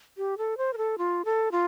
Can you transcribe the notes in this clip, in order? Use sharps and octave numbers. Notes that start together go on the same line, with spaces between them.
G4
A4
C5
A#4
A4
F4
A4
F4